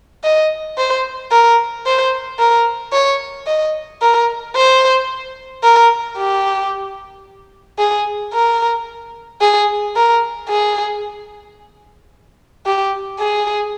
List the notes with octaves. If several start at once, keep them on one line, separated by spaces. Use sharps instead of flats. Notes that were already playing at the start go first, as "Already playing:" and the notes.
D#5
C5
A#4
C5
A#4
C#5
D#5
A#4
C5
A#4
G4
G#4
A#4
G#4
A#4
G#4
G4
G#4